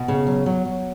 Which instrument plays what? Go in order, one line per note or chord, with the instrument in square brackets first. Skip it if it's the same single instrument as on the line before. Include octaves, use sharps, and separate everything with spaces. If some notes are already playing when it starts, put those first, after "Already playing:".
Already playing: [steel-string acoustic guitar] B2
C#3
F#3
F#3
F#3